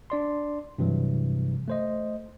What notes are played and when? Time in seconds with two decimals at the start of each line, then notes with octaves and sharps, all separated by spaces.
0.10 D4 D5 C6
0.78 G2 C3 E3 F#3 G3
1.68 A3 C5 D#5